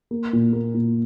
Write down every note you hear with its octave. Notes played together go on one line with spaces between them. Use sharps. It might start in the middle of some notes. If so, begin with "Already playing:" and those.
A#3
A#2
A#3
A#2